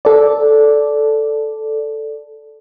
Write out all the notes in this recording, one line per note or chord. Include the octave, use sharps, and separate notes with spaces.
A4 D5